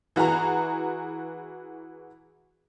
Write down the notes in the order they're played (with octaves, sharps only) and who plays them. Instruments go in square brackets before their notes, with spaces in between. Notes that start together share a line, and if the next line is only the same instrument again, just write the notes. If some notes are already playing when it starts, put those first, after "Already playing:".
[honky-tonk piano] E3 F#4 G#4 A#5